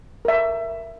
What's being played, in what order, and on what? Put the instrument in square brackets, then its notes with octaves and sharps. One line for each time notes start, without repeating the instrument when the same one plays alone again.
[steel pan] A#4 E5